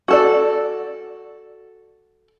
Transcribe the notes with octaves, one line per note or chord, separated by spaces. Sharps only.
F#4 A4 D5